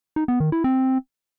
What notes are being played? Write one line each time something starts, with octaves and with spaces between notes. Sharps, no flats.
D#4
B3
D#3
E4
C4